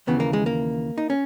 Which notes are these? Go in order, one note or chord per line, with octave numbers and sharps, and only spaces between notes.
D#2 C#3 E3 B3
A#3
G#3
A#3
D#4
C#4